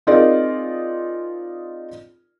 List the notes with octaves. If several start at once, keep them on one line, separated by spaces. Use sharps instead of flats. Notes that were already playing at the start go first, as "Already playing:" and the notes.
C4 D#4 F4 G#4 A#4 D5